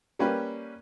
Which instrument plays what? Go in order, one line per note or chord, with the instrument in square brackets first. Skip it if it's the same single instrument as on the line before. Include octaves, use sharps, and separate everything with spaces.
[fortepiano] G3 A#3 C#4 G4 B4